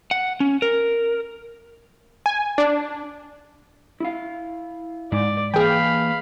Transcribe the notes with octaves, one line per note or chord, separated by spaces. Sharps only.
F#5
C#4
A#4
G#5
D4
E4 F5
G#2 D5
E3 A#3 G#4 F5 G5 B5